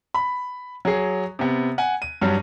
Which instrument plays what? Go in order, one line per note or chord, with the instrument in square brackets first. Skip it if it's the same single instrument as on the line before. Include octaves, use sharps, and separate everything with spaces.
[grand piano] B5
F#3 G#4
C3 B3
F#5 G#5
D#7
G2 F#3 G3